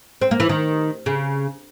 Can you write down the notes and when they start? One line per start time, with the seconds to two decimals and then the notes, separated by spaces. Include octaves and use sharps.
0.21 C4
0.31 A#3
0.40 E3
0.49 D#3
1.06 C#3